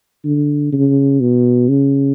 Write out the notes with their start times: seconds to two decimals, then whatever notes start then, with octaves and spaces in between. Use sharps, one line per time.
0.25 D3
0.72 C#3
1.20 B2
1.69 C#3